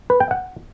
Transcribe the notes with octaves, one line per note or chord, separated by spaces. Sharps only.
B4
G5
F#5